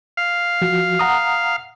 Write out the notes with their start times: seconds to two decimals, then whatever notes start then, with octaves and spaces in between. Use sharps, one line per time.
0.17 F5
0.62 F3 F#4
0.99 F#5 A#5 D#6